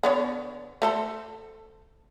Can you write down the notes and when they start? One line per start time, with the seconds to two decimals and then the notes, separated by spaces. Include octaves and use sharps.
0.03 D3 B3 C#5
0.82 A3 A4 C5